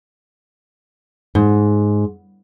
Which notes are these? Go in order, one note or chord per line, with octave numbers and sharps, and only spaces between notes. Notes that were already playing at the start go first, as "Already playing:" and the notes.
G#2